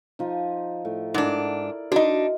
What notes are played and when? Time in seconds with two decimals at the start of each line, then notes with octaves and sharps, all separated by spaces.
0.19 F3 D#4
0.85 A2
1.14 G#2 D4 E4 A#4 D5
1.92 D4 D#4 F#4 D#5